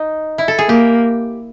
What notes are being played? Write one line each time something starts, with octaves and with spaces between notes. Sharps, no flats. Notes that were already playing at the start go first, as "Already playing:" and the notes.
Already playing: D#4
E4
A4
G#4
A#3 G4